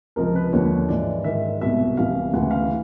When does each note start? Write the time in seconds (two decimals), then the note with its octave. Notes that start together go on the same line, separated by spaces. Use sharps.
0.16 C#2 C3 F3 A#4
0.35 B4
0.53 D#2 D3 F3 C#5
0.89 G#2 E3 D5
1.24 G#2 D#3 E5
1.61 C2 B2 E5
1.97 C2 C3 E3 F5
2.33 D2 C#3 E3 F#5
2.51 F5